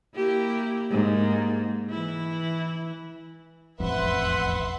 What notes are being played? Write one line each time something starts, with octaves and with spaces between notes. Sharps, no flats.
A#3 E4 G4
G#2 A#3
E3 E4
E1 A1 F2 B4 E5 F#5 C6